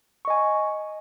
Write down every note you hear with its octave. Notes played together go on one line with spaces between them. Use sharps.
D#5 G#5 C#6